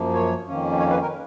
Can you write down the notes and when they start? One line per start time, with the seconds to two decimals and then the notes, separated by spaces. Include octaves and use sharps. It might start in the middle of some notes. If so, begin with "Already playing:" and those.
Already playing: F#2 F3 A#3
0.14 C#5
0.47 F2 D#3 A#3 C#4
0.79 C#5
0.91 B4
1.02 A#4